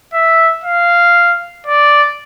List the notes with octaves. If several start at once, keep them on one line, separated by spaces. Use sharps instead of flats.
E5
F5
D5